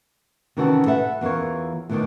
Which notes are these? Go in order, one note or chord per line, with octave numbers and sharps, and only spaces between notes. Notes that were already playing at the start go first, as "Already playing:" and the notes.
C3 D#3 E3 C#4 F#4 A4
A4 B4 E5 F#5
E2 E3 F4 A#4 C#5
E2 A2 D3 D#3 C#5 D5